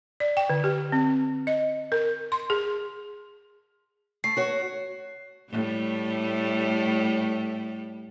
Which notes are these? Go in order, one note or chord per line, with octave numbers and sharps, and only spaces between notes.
D5
G5
D3
G4
C4
D#5
A#4
C6
G#4
A3 C7
F#4 C#5
A2 G3 A3